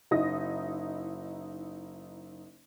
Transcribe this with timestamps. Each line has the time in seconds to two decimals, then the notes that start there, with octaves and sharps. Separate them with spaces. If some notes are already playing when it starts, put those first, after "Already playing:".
0.11 F#1 D#4 E4 D#6 A#6